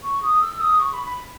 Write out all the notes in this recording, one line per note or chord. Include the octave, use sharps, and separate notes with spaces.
C#6
D#6
E6
D#6
C#6
B5
B5